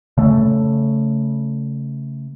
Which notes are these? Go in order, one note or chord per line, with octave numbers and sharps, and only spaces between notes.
C#3 A3